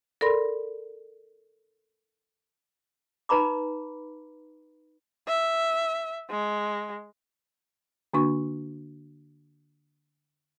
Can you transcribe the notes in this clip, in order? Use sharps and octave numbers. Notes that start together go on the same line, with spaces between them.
A4 A#4 D5 B5 C6 A#6
D#4 B4 A#5 B5 D6
E5
G#3
D3 A#3 D4 F#4 C#6